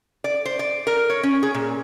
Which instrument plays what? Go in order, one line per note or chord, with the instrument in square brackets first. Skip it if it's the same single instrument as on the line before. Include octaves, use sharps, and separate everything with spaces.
[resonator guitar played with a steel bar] D5
C5
D5
A#4
C#5
C#4
G#4
A#2